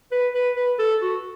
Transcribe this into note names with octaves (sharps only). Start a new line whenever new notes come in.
B4
B4
B4
A4
F#4